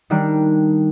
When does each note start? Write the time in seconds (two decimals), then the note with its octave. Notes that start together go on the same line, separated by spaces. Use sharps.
0.10 D#3 G3 D4 A#4